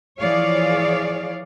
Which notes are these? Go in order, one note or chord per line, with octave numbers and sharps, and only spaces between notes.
E3 F3 G#4 C#5 D5 F5